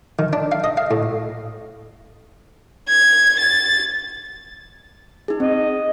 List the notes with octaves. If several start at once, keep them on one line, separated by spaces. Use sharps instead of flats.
D#3
D4
F5
D#5
F5
A2
G#6
A6
D#4 G#4
C4 D#5